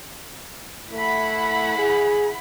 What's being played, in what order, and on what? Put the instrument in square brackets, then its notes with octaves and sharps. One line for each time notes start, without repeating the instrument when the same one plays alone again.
[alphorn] A3 [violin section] E4 F#5 B5
[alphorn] G#4